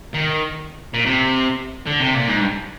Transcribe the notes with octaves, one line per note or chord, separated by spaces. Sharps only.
D#3
A#2
C3
D3
C3
A#2
G#2
G2